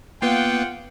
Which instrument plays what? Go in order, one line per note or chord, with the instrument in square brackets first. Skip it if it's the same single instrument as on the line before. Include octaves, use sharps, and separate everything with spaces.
[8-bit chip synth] A#3 B3 B4 [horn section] F4 F#5 G5